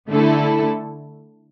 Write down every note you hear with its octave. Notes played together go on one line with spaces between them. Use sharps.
D3 A3 E4 A4